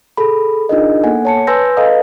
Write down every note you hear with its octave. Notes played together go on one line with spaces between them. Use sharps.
G#4 A4 B5
D4 D#4 F4 G#4 A#4 D#5
A#3 B3 A4 F#5 G#5
C#5 A5 C#7
B4 G#5 C6 E6 G6 A#6
A4 B4 D#5 F5 A#5 D#6